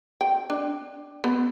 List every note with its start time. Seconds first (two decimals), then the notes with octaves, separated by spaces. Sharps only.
0.21 G5
0.50 D4
1.24 B3